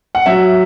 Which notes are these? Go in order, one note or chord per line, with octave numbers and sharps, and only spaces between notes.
F#5
F#3 E5